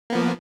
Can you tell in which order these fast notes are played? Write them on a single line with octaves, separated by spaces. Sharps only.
A#3 B3 F3